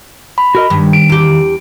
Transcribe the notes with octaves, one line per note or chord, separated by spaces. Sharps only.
B5
F#4 A#4 D#5
G2 D#3
D7
E2 G4